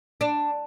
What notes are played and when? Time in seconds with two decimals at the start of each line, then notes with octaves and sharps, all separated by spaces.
0.21 D4